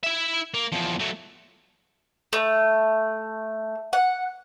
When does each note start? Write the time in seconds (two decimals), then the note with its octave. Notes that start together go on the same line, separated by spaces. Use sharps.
0.04 E4 E5
0.54 A#3
0.72 E2 F3
0.99 F#3 A3
2.33 A3
3.93 F#5